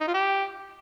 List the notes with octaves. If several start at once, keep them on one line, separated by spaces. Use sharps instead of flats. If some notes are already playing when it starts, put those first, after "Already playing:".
D#4
F4
G4